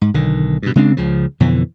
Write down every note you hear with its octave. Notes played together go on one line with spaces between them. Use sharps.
G#2
B1 D3 D#3
G2 B2
C#3 G#3 C4 D4
C#2 C#3 F3
F2 B2 D3 E3